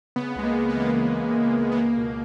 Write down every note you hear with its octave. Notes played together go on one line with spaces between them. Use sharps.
C#3 B3
C#2 G#3
A#3
C#2
B3
E3 A#3
C#3 B3
C#2
C#2
C#2
B3
C#2 A#3
B2